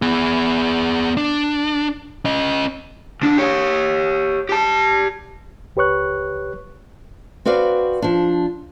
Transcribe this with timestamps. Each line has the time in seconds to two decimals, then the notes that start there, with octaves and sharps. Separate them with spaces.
0.02 B3 G#4
1.17 D4
2.25 C#4 D#5
3.22 C#2 D4
3.38 G4 C#5
4.49 G4 A5
5.76 C#2 G4 B4 C#5 C#6 F#6
7.45 C4 F#4 B4 D5 F5
8.02 F3 D4